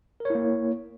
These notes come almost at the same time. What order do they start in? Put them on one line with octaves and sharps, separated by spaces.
A#4 C#5 E4 A#3